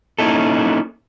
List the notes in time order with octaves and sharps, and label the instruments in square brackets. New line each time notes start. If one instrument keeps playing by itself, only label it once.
[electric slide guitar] A#3 C#4 D#4 E4 A4